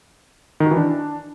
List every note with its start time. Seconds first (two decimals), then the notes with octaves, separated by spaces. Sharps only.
0.60 D#3
0.66 F#4
0.71 E3
0.77 D4